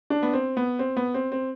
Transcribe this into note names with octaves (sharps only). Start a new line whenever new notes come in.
D4
B3
C4
B3
C4
B3
C4
C4